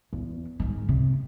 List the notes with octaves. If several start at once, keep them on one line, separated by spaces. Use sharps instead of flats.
E2
G#2 D#3
C3